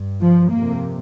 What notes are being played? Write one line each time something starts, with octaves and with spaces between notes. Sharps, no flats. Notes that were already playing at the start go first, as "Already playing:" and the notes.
Already playing: G2
F3
F2 C3 A#3